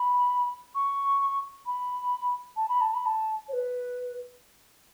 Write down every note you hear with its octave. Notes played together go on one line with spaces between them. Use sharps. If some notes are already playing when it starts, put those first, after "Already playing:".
Already playing: B5
C#6
B5
A5
B5
A5
B5
A5
C#5
B4